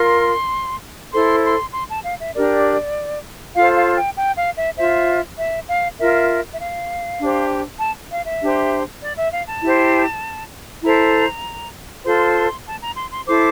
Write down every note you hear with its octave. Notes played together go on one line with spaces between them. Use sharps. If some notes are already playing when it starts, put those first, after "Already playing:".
Already playing: F4 A#4 C6
E4 A4 C5 C6
C6
C6
A5
F5
E5
D4 G4 A#4 D5
F4 A4 C5 F5
F5
G5
G5
F5
E5
F4 C5 E5
E5
F5
F4 A#4 E5
E5
F5
D4 G4 C5
A5
F5
E5
D4 G4 C5
D5
E5
F5
A5
E4 G4 C5
E4 A4 C5 A#5
F4 A4 C5 C6
C6
A5
A#5
C6
C6
E4 A4 C5 D6